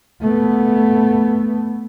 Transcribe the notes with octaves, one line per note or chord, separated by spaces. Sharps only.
A3 B3